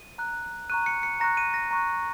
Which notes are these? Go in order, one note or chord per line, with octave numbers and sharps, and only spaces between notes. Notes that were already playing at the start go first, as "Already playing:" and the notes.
Already playing: D#7
A#5 F#6
A#5 C#6 F#6 D#7
C#7
C#7
A#5 C#6 F#6 A#6
D#7
A#6
A#5 C#6 F#6